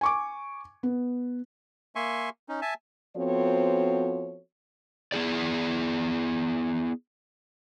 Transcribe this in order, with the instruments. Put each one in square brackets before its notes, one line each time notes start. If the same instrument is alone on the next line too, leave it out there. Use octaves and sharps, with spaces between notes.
[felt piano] G#5 C#6 D6
B3
[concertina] A#3 E5 G#5 C6 C#6
C#4 D#4
E5 G#5 A5
[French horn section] F3 B3 C4 F#4 A4 C#5
[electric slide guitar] B3 E4 G#4 D5